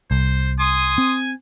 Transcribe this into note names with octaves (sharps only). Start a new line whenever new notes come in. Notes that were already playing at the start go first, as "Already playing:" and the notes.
C2 C5
G#5 C6 D#6
C4